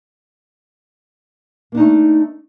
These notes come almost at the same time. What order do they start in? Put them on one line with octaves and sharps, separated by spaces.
A#3 D4 D#4 A3